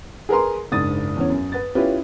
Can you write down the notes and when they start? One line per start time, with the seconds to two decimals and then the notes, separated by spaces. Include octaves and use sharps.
0.29 G#4 A#4 B4 A#5 C6
0.72 F#1 G#2 D4 D#6 A6
1.16 E2 C#4
1.30 F#2
1.52 B4 A6
1.75 C#4 E4 F4 G4 B4